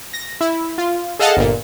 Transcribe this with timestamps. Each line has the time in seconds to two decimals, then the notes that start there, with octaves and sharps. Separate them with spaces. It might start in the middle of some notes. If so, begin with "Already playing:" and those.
0.14 A#6
0.41 E4
0.78 F4
1.19 G#4 A4 D#5 F5 F#5 A5
1.37 G1 A#2